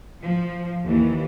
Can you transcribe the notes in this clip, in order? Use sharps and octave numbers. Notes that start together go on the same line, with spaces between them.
F3
D#2 E3